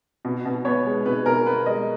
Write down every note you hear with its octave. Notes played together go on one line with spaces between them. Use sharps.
B2
B2
B3 C#5
G#3
B2 B4
B2 A#4
B3 B4
G#3 D#5